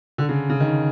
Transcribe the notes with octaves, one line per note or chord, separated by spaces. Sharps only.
D3
C#3
C#3
D#3